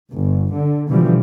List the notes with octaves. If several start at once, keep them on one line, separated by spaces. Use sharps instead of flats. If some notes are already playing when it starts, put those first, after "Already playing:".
G1
D3
B2 D3 E3 F3 G3